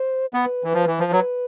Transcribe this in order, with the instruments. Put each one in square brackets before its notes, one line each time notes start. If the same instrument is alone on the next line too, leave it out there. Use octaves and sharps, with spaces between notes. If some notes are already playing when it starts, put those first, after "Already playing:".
Already playing: [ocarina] C5
[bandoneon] B3 [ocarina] B4
[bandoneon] E3
F3
E3
F3
[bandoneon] F#3 [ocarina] B4